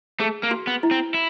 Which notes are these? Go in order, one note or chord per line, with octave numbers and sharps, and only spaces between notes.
A3 G#4
A#3
F#4
B3
E4
C4
E4